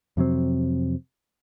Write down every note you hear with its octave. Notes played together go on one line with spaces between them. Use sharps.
F2 C3 F#3 C4